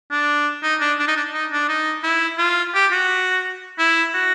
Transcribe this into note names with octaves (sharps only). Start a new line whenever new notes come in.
D4
D#4
D4
D4
D#4
D4
D#4
D4
D#4
E4
F4
G4
F#4
E4
F#4